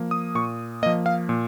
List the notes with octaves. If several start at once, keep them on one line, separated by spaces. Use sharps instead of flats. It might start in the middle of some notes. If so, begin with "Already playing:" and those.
Already playing: F3 A#3
D#6
A#2 C#6
F3 A#3 D#5
F5
A#2